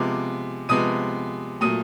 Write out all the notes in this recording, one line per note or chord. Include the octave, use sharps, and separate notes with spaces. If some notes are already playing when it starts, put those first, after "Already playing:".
Already playing: C3 F3 G#3 B3 D6
C3 F3 G#3 B3 D#6 D#7
A#2 F#3 A3 D#6 D#7